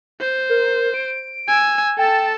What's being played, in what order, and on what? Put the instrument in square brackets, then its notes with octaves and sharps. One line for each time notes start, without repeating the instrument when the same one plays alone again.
[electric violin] C5
[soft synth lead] A#4
D7
[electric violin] G#5 E6
[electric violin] A4 A5 [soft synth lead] G5